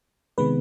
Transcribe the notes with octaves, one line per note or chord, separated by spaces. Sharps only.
C3 D#3 G#3 B3 B4